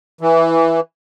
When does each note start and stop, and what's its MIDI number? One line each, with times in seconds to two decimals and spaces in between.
0.21 0.80 52